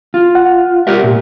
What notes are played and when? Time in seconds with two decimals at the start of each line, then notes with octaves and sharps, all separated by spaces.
0.14 F4
0.35 F#5
0.87 G4 A#4 E5
1.04 A#2